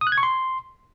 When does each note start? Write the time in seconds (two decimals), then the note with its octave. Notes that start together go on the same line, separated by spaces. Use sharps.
0.01 D#6
0.07 F#6
0.12 G#6
0.18 C#6
0.23 C6